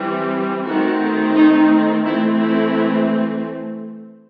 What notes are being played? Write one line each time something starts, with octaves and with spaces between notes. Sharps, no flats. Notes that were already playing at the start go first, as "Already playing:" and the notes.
Already playing: E3 G3 C4
D#3 A3 C4 F#4
D#4
E3 A3 C4 E4
E4